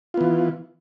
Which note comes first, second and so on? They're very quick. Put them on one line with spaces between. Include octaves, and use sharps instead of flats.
F4 B3 E3